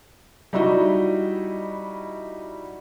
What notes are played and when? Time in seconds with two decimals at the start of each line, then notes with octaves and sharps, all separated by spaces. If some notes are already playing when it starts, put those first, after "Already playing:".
0.53 G3 D#4 E4 F#4 D#5